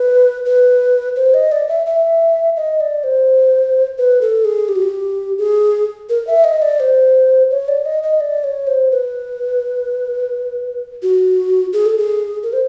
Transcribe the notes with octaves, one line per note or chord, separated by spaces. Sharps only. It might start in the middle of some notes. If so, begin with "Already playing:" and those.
Already playing: B4
B4
C5
D#5
D5
E5
E5
D#5
D5
C5
B4
A4
G#4
G4
F#4
G4
G#4
A#4
E5
D#5
D5
C5
C#5
D5
D#5
D#5
D5
C#5
C5
B4
F#4
G#4
A4
G#4
A#4
C5